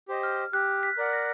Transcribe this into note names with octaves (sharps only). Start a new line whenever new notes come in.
G4 C5 D#5
F6
G4 F#6
B6
A#4 D5 F#5
A#6